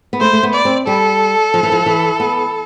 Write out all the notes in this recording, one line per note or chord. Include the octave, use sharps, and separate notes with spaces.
B3
A3 C5
A3
B3
D5
C4
G3 A4
F3
E3
F3
E3
B3